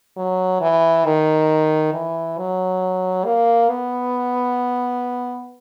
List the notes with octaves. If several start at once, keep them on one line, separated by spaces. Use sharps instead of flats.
F#3
E3
D#3
E3
F#3
A#3
B3